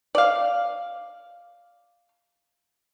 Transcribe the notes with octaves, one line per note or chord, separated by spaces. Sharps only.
D5 F5